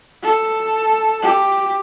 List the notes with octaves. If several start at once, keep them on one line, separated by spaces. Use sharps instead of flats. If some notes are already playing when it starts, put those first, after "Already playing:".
A4
G4